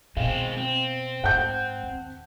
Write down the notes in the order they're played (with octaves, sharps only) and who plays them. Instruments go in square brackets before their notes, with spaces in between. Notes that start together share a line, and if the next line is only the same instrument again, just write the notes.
[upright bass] B2 [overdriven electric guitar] G#3 C4 [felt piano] F5
[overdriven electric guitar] C4
[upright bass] G#2 [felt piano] F#5 A5 G6
[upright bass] D#2